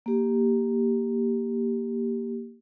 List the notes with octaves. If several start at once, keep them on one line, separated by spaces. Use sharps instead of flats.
A#3 G4